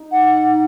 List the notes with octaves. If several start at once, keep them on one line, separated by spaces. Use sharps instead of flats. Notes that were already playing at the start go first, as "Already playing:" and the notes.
Already playing: D#4
F#5